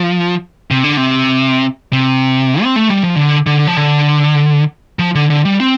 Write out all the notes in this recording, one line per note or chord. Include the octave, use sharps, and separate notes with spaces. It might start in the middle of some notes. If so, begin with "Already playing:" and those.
Already playing: F3
C3
D3
C3
C3
C4
A3
G3
F3
D3
D3
F3
D3
F3
D3
D3
G3
C4